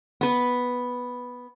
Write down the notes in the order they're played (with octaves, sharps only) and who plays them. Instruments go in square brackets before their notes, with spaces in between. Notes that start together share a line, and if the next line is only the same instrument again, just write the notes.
[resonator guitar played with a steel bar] B3 B4